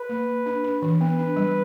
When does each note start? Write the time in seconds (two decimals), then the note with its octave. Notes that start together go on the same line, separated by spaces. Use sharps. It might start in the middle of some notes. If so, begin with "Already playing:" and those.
Already playing: B4
0.09 A#3
0.28 A#3
0.46 D4
0.64 D4
0.82 E3
1.00 B3 B4
1.19 D4
1.36 G3